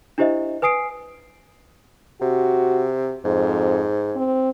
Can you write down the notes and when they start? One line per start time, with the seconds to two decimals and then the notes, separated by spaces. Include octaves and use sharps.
0.18 D4 E4 G4 C5 D#5 E5
0.62 B4 G#5 D#6 C7 D7
2.21 C3 F#4
3.25 F2 G#2
4.16 C4